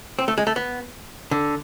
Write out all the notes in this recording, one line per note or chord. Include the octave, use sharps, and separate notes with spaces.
C4
A3
G#3
A3
B3
D3